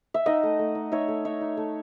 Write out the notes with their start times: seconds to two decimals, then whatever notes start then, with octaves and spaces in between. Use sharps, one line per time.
0.14 E5
0.26 D#4 D#5 F#5
0.43 A3
0.59 A3
0.75 D#4
0.91 D#4 C#5 E5
1.08 A3
1.25 D#4 C#5 E5
1.41 D#4
1.57 A3